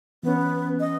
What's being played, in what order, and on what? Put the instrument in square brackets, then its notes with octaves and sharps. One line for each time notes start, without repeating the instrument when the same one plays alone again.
[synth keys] E3 C#4 [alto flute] B3
[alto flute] D#5